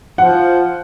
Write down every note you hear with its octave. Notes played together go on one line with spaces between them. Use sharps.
F3 F#5